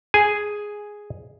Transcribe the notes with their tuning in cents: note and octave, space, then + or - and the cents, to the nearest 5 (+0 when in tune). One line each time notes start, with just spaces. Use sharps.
G#4 +0 G#5 +0